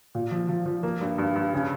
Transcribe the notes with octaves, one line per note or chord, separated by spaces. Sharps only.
A#2
F3
F3
F3
A#3
G2
G2
G2
C#3